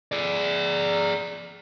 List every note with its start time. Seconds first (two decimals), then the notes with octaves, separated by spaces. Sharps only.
0.12 G#4 D5